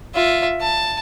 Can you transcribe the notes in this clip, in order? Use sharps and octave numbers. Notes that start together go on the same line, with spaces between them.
F4 E5
A5